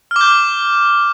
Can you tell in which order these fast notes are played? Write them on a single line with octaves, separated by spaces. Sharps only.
F6 D6 G6